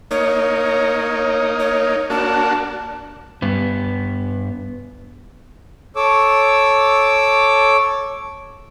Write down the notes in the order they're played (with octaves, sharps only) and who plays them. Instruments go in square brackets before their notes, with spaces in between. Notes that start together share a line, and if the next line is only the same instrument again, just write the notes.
[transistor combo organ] A#3 D#4 [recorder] C#5
[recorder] C#5
[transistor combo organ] A#3 D4 F#4 [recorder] A5
[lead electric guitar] G2 B3
[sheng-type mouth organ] A4 C#5 D6 E6